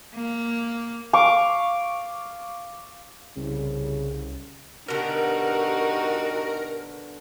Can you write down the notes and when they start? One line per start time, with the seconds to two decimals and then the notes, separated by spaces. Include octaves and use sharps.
0.15 A#3
1.13 F5 C#6 D6
3.37 C2 C#3
4.88 B2 D3 D#4 F#4 G4 A#4